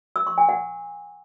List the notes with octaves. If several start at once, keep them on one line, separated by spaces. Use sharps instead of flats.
E6
C#6
G#5
F#5